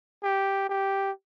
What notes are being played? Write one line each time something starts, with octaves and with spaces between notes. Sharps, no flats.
G4
G4